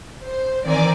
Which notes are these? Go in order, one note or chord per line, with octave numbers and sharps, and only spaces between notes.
C5
D#3 E3 C4 D5 G#5 A#5